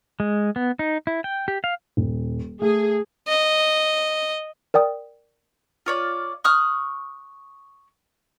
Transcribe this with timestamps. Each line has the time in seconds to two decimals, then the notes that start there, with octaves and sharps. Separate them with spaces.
0.20 G#3
0.56 B3
0.79 D#4
1.07 E4
1.24 G5
1.48 G4
1.64 F5
1.97 D#1
2.62 A3 G#4
3.28 D#5
4.74 A#4 D5 G5 D#6
5.86 F4 C#5 D5
6.44 C#6 D#6 F6 F#6